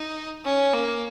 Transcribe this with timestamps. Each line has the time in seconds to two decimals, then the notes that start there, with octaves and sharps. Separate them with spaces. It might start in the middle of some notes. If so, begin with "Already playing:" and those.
Already playing: D#4
0.45 C#4
0.74 A#3